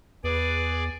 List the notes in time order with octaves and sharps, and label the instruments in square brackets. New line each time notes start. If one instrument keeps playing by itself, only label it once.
[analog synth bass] E2 [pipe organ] G#4 D5 [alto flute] B4